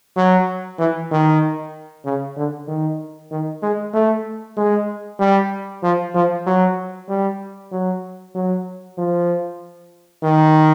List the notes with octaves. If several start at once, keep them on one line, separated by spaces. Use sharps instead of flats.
F#3
E3
D#3
C#3
D3
D#3
D#3
G#3
A3
G#3
G3
F3
F3
F#3
G3
F#3
F#3
F3
D#3